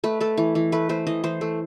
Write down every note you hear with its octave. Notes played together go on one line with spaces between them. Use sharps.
A3 B4
A3 A4
E3
E3
A3 B4
A3 C5
E3 D#5
E3 C5
A3